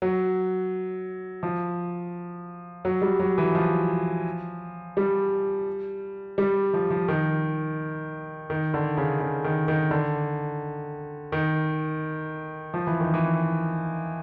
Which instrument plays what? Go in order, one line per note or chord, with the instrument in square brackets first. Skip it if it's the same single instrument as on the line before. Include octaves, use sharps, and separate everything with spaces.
[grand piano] F#3
F3
F#3
G3
F#3
E3
F3
G3
G3
F3
F3
D#3
D#3
D3
C#3
C#3
D#3
D#3
D3
D#3
F3
E3
D#3
E3